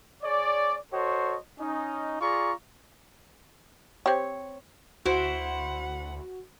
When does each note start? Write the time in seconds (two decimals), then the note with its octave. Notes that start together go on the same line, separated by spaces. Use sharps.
0.23 G#4 C#5 D5
0.91 F#4 A4 C5 C#5 D#5
1.59 C#4 D#4
2.20 F4 G#4 D5 A#5 C#6
4.06 C4 G4 C#5
5.06 D2 E4 F#4 C5 F#5